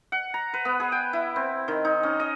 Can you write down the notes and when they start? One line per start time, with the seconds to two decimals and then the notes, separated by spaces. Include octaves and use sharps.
0.12 F#5
0.34 A#5
0.54 B4
0.65 B3
0.80 G#4
0.92 G5
1.13 E4
1.36 C4
1.68 D#3
1.85 D#4
2.03 C#4
2.20 D#5